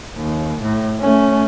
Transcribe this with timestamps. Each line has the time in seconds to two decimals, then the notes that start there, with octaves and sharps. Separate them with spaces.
0.16 D#2
0.61 A2
1.01 A3 C#4